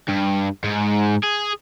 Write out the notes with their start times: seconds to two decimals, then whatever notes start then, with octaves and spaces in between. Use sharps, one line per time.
0.08 G2
0.64 G#2
1.24 G#4